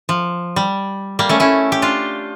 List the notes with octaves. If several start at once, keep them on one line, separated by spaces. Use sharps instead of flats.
F3
G3
G3 A#3
A3 C#4
C#4 E4
G4
D4 F4